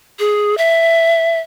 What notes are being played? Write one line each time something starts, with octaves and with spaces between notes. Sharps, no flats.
G#4
E5